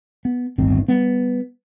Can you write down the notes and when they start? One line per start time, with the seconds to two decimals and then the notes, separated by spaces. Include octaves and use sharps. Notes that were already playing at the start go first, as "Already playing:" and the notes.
0.25 B3
0.58 D1 G1 D#3 C4
0.88 G3 B3